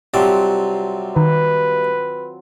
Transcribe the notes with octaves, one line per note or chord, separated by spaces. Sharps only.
C3 F#3 G3 C4 F4 A5
D#3 B4